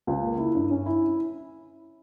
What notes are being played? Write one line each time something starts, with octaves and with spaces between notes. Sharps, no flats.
C#2
A#3
E4
G2
C#4
E4